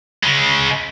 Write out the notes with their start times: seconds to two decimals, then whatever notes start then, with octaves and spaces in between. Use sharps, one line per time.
0.23 C#3 G#3